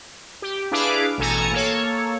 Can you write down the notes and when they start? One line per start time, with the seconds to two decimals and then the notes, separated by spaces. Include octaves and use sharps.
0.42 G4
0.72 D4 E4 G#4 B4 F5 D6
1.18 A1 B2 A4 G#5 A#5 C#7
1.53 A#3 A4 C#5